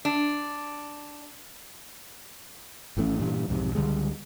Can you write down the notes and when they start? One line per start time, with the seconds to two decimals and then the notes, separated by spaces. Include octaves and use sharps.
0.05 D4
2.97 G#1 E3 A3 C#4
3.19 G2 A#2 E3
3.49 B1 F2 G#2 C3
3.75 C#2 D3 G3 G#3